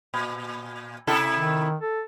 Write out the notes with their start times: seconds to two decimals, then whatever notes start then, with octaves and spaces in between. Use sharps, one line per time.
0.14 A#2
1.07 C3 E4 A4
1.34 D#3
1.81 A4